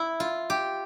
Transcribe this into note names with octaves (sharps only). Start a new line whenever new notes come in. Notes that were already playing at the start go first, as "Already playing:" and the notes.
Already playing: E4
F4
G4